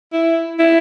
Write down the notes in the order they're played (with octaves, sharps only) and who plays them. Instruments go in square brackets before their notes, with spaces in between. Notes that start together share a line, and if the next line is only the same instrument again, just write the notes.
[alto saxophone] E4
E4